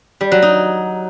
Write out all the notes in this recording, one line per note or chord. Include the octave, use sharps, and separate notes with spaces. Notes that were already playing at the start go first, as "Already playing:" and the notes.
G3
F#3
D#4